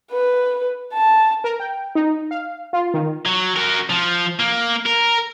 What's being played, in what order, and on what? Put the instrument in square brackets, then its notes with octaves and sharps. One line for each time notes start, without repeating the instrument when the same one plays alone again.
[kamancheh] B4
A5
[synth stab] A#4
G5
D#4
F5
F4
D#3
[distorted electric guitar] F#3
F#4 A#4
F3
A#3
A#4